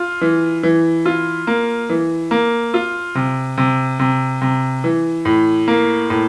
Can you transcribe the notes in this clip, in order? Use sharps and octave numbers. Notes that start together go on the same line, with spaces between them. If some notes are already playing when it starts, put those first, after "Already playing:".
Already playing: F4
E3
E3
F4
A#3
E3
A#3
F4
C3
C3
C3
C3
E3
A2
A#3
A2